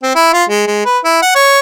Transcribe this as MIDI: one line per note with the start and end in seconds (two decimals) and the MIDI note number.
0.03 0.11 60
0.15 0.32 64
0.33 0.44 65
0.49 0.63 56
0.67 0.85 56
0.85 0.99 71
1.04 1.19 64
1.22 1.33 78
1.35 1.59 73